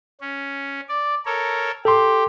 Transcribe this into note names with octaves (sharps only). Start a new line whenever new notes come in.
C#4
D5
A4 A#4 C#5
G4 A4 C6